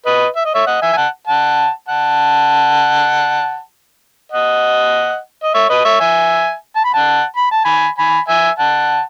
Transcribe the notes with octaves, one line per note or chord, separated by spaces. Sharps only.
B4 D#5
E5
D#5
C#5 E5
D#5 F#5
E5 G#5
G#5
F#5 A5
F#5 A5
F#5 A5
D#5 F#5
D#5
C#5 E5
B4 D#5
C#5 E5
E5 G#5
A5
B5
F#5 A5
B5
A5
G#5 B5
G#5 B5
E5 G#5
F#5 A5